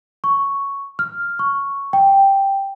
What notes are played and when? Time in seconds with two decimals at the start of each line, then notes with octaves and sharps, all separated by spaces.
0.24 C#6
0.99 F6
1.39 C#6
1.93 G5